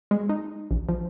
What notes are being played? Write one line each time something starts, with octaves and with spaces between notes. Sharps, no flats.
G#3
D#4
A#1
F3